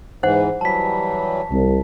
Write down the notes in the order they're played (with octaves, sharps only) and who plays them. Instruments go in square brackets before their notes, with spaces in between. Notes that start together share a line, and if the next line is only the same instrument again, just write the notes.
[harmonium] G#2 E3 [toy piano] C5 F#5
[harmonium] E3 F#3 G3 [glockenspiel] A5 B6
[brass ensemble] C2